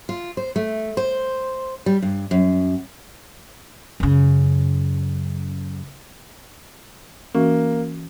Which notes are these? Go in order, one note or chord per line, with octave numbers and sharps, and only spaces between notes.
F4
C5
A3
C5
G3
G2
F#2
F#2 C#3
E3 A#3 C#4 F#4